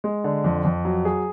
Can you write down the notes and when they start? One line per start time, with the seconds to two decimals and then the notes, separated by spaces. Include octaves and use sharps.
0.04 G#3
0.24 D3
0.44 F2
0.65 F2
0.85 F#3
1.05 G#4